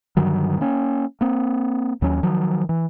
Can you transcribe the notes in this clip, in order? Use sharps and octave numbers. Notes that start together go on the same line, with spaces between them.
G2 D3 D#3 F#3
A#3 C#4
A#3 C4
D#2 F#3 C#4
D#3 F3 F#3
E3